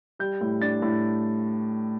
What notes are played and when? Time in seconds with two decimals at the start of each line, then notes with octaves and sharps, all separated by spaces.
0.19 G3 G6
0.41 A2
0.61 D4 A6
0.82 A2